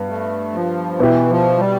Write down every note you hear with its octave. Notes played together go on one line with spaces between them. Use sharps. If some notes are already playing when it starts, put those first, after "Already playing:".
Already playing: G2 B3
A3
F3
B2 E3 B3 E4 G4
F3
G3